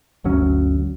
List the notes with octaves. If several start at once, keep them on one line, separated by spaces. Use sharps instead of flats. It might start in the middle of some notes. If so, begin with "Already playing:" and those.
G1 D2 F#3 C#4